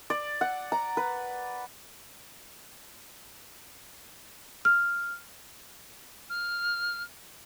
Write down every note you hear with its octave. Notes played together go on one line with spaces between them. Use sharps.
D5
F#5
A#5
B4
F6
F6